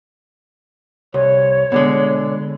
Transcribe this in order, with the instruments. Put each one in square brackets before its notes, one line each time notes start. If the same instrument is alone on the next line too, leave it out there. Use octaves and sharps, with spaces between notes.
[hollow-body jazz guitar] C2 [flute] C#5
[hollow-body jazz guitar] B2 D3 G#3